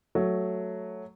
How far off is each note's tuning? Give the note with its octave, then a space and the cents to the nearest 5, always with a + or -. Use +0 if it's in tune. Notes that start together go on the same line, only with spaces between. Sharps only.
F#3 +0 A3 +0